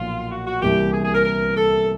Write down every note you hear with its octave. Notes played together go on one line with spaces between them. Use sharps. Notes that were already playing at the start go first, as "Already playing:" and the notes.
Already playing: B1 A#2 F3 F4
F#4
F#4
C2 C3 E3 G3 A#3 G4
G#4
G#4
A#4
A#4
A4